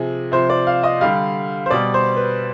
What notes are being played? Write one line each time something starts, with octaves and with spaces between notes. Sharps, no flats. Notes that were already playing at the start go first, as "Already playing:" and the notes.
Already playing: C3 F3 G#4
C3 F3 C5
D5
F5
D#5
D3 G3 F5
C5
B2 G3 D5
C5
B4